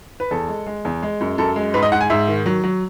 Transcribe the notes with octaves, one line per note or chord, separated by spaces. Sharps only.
B4
E2 A4
G#3
G#3
E2
G#3
F#2
F#2 A4
G#3
G#2 B4
D#5
G#2 F#5
G#5
G#2 E5
D#3
F#3
F#3